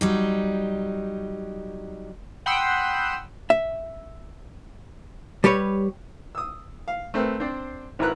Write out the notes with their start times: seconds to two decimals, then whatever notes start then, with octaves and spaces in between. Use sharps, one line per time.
0.01 F#3 G3 D#4
2.46 F#5 G5 B5 C6 D#6 E6
3.50 E5
5.44 G3 G4 B4 C#5
6.35 D#6 E6
6.88 F5
7.14 A3 C4 A#4 B4
7.40 C4 D4 C5 D5
7.99 G#1 E4 A#4 B4 A#5 F#6